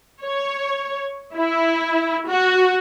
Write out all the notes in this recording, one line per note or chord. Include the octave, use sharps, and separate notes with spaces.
C#5
E4
F#4